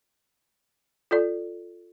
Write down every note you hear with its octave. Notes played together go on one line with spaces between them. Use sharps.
F4 A4 D5